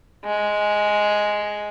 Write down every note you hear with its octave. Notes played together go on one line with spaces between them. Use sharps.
G#3